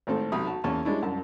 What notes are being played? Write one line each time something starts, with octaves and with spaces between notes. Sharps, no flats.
G#1 A2 C4 A4
B1 C3 B5 D#6
F#4 A5
E2 A#3 C#4 C#5 A5
G3 G#3 C#4 D4 E4
C2 F#2 A5